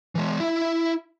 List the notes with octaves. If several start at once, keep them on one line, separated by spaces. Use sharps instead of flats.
E3 G#3
E4 E5